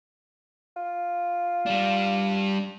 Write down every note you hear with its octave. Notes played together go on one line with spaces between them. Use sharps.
F4
G3 D4